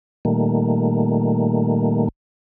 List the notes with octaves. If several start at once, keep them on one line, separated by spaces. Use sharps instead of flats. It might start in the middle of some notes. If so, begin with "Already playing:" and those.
A#2 D#3 G3 A3 A#3